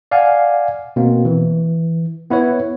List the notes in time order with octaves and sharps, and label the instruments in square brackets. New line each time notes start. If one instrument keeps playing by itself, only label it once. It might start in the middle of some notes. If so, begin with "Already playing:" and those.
[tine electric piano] D5 F5 F#5 G#5
B2 A#3 C4
E3
B3 E4 B4 C#5